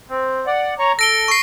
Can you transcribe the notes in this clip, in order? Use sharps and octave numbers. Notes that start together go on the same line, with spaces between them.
C4
D5 F#5
C#5 A#5 C#6
A4 A#6 D7 G7
C#6 C7